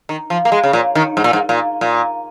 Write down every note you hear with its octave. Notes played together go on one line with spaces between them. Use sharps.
D#3
F3
A#3
G#3
C#3
A#2
D#3
G#2
A#2
G#2
A#2
A#2